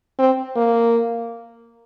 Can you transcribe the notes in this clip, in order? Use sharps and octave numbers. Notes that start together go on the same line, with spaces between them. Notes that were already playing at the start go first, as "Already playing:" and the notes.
C4
A#3